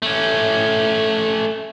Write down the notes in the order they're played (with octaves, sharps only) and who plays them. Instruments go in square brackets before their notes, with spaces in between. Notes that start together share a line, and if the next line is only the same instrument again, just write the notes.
[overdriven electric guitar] A3 C#4